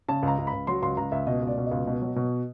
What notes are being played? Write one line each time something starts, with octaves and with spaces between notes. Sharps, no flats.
C#3 A5
C#2
A#5
C#2
B5
C#2
F#3 C6
C#2 C6
C#2 A#5
C#2 E5
B2 D#5
C#2 D5
B2
C#2 D#5
B2
F#3
B2